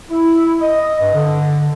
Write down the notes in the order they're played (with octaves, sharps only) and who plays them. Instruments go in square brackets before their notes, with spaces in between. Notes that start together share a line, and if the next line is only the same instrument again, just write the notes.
[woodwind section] E4
D#5
G2
D3